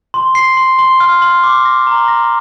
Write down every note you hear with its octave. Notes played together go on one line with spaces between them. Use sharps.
C6
C7
C6
C6
F6
C6
D6
A#6
A#5
A#6